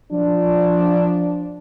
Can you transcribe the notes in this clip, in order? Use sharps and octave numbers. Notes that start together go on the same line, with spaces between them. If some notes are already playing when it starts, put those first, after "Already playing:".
F3 D4